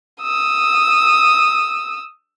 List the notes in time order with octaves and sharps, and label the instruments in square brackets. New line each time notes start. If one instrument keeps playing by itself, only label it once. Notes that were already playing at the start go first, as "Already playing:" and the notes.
[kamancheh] D#6 E6